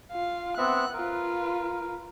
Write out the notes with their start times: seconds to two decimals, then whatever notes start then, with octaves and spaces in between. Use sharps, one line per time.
0.12 F4 F5
0.58 B3 C4 E5 F#5 F#6
0.94 F4 A#4 B4